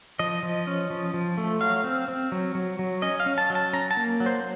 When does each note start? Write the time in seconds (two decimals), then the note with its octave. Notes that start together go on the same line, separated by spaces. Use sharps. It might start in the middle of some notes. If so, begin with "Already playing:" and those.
0.19 F3 D#5
0.43 F3
0.67 C#4
0.90 F3
1.14 F3
1.38 A3
1.61 F#3 F5
1.84 C4
2.08 C4
2.32 F#3
2.55 F#3
2.79 F#3
3.02 C#4 D#5
3.20 F5
3.26 C#4
3.38 A5
3.50 F#3
3.55 A5
3.73 C#4 A#5
3.91 A5
3.97 A#3
4.20 F#3
4.26 C5